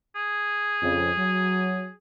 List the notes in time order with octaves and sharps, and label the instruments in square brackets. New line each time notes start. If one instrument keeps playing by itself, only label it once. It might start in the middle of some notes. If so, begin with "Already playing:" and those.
[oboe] G#4
[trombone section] F2 C#3
F#3